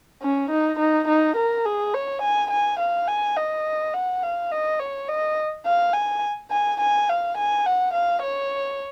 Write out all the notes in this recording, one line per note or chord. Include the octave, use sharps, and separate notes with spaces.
C#4
D#4
D#4
D#4
A#4
G#4
C#5
G#5
G#5
F5
G#5
D#5
F#5
F5
D#5
C#5
D#5
F5
G#5
G#5
G#5
F5
G#5
F#5
F5
C#5